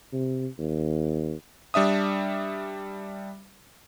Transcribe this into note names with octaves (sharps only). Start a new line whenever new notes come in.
C3
D#2
G3 D4 E5 D#6